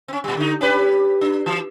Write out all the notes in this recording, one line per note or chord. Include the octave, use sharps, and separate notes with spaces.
C4 C#4
A#2 G3
D3 D#4
C#4 G4 B4
D4
E3